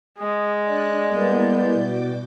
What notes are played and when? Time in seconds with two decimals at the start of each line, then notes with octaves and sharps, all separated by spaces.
0.18 G#3 D#6
0.65 D4 D5 F#6
1.08 G3 A#3 B3 E4 G6
1.79 B2 F#4 G5 D6